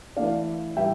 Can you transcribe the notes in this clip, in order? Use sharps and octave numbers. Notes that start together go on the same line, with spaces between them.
E3 A3 D4 D5 F5
A2 E3 G3 E5 G5